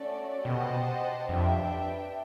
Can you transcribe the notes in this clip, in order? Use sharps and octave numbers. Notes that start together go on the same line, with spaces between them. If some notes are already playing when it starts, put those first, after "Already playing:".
Already playing: A3 C#4 F#4 A4 D5
B2 G4 C5 D#5 F#5 A5
F2 D4 G4 B4 E5 G5